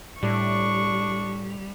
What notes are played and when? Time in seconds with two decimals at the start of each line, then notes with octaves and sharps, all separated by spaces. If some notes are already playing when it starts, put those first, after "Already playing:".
0.23 A2 G3 D4 C#6